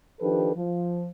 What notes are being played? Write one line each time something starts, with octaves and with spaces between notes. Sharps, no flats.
D#3 F3 D4 G4 A4 B4
F3